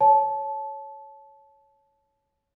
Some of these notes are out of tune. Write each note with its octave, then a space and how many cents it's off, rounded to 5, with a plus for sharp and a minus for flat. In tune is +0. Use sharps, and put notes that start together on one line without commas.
C#5 +0 A5 -20